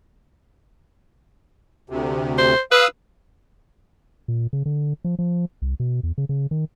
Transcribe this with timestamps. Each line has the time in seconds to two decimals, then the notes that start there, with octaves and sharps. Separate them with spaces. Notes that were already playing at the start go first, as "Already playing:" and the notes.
1.90 D2 C3
2.38 C5
2.72 B4 F5 D#6 E6
4.28 A#2
4.53 C#3
4.66 D3
5.04 F3
5.19 F3
5.62 C2
5.80 B2
6.03 E2
6.18 C#3
6.29 C#3
6.51 D#3